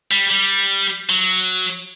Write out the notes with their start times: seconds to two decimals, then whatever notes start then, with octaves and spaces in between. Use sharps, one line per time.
0.11 G3
0.31 G3
1.09 F#3